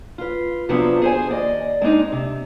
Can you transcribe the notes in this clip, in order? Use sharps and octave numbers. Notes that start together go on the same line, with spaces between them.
F4 B4
C3 F3 F#3 B3 C4 D4
G#4 C5 G#5
D#2 D5 D#5
G#3 C4 D4 D#4
C3